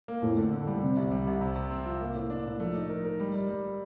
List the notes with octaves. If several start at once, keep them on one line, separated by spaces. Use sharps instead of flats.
A#3
F2 A2
D3
D3
G3
C3 G3
C2
G3
C2
C3
C3
C4
F3
A#3
A2
D4
A2
F3 A3
D#4
A#4
A#4
G3
G3
G3